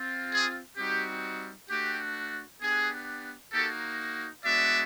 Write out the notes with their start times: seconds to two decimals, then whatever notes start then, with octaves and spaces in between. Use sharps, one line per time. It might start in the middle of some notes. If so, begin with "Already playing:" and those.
Already playing: C4 F4
0.32 G#4
0.77 G3 C4 D#4 F#4 G4
1.69 A3 D4 F#4 G4
2.61 B3 D4 G4 G#4
3.52 A#3 D#4 F#4 G4 A4
4.44 G#3 B3 D4 F#4 D5 E5